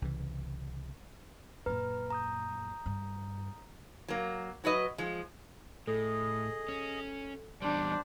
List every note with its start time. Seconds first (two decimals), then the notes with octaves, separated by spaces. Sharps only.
0.02 C2 C#3 E3
1.66 F#2 A#2 B4 A#5 F6
2.10 A#5 D#6 G6
2.86 G2
4.08 F#3 A#3
4.64 F#3 F#4 B4 D#5
4.98 F3 G#3
5.87 A2 G#4 A4 D#5
6.69 C#4
7.62 E2 G3 D4 G4 C5